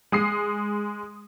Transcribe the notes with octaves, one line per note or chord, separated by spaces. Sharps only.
G#3 D#6 C7